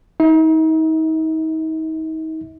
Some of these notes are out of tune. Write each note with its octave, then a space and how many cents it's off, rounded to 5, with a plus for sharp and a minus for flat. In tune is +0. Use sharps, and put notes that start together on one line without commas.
D#4 +35 E5 -40